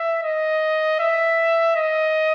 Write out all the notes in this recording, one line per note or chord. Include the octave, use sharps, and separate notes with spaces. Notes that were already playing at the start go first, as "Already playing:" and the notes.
Already playing: E5
D#5
E5
D#5